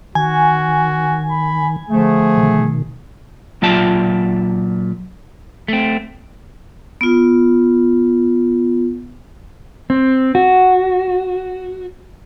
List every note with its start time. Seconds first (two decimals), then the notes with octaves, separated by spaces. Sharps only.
0.15 D#3 F#4 G#5
1.31 B5
1.90 D3 F3 A3 G#4
2.37 B2 D#3
3.62 A#2 F#3 F4 D5 E5 A5
5.68 A3 C4
7.01 B3 F4
9.90 C4
10.35 F#4